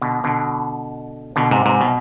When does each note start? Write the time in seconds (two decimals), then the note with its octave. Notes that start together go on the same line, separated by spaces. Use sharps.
0.02 B2 D3
0.24 B2 D3
1.36 B2 D3
1.51 G#2 C3
1.66 G#2 C3
1.81 B2